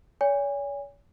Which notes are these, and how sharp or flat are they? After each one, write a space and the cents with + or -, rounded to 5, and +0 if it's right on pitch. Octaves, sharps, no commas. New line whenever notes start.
C#5 +40 G#5 -30